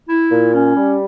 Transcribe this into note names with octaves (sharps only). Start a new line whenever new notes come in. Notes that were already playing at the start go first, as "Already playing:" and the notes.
E4
A#2
C#4
G3